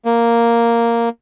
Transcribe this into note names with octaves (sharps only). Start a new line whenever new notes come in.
A#3